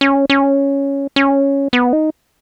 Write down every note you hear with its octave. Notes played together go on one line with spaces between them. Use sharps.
C#4
C#4
C#4
B3
D#4